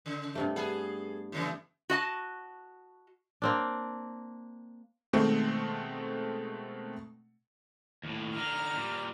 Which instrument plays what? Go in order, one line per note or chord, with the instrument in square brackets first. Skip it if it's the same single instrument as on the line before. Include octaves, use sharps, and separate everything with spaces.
[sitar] C#3
[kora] G2 C3 A3
[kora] B3 [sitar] G#4 A4
[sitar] A2 C#3 E3
[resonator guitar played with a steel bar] F#4 D#5 A5
[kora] A#3 C4 D4
[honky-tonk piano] B2 D#3 G#3 A3 C4
[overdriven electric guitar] D#2 A2
[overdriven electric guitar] D3 D#4 [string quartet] A#5 F6
[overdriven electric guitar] A#2 G3